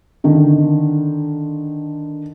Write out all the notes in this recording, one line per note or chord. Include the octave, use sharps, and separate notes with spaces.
D3 D#3